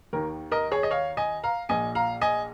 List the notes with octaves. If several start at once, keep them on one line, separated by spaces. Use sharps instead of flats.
D#2 D#3 A#4
A#4 D#5
G#4 C#5
D#5
C#5 F5
D#5 G#5
F5 A#5
A#1 A#2 D#5 G#5
F5 A#5
D#5 G#5